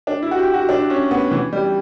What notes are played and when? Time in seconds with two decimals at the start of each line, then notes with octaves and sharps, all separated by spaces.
0.07 D4
0.22 E4
0.31 F#4
0.38 G4
0.54 F#4
0.69 D4
0.90 C#4
1.11 B3
1.31 E3
1.53 G3